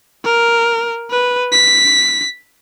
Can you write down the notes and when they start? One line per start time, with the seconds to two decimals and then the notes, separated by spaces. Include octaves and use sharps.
0.24 A#4
1.10 B4
1.52 B6